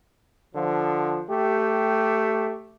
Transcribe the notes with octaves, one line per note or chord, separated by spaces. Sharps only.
D3 F3
A3 G4